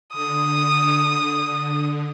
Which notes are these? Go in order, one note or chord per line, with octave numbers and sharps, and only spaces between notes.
D3 D#6